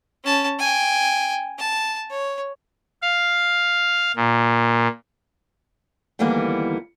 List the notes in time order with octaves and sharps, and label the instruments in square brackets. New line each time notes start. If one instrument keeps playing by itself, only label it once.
[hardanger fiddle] C#4 A5
G5 G#5
A5
C#5
[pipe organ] F5
A#2
[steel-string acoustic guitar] D2 D#3 E3 G3 A#3 B3